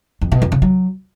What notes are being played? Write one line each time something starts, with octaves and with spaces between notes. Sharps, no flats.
F2
B2
F2
C#3
F#3